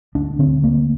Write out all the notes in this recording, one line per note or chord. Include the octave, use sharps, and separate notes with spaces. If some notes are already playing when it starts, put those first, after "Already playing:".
D2 D4
D3 C4
D2 A#3